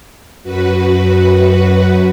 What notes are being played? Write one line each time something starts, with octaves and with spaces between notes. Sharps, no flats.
F#2 F#4 B4